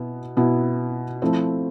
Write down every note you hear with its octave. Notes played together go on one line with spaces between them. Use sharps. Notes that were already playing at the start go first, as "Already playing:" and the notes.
Already playing: B2 B3 E4
B2 B3 E4
F3 A3 C4 E4